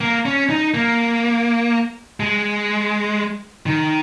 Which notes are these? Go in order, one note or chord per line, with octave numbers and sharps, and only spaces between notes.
A#3
C#4
D#4
A#3
G#3
D#3